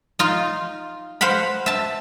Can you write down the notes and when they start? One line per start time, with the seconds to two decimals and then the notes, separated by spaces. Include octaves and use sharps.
0.19 D#4 F4
1.21 C5 F5 F#5 B5
1.66 E5 A5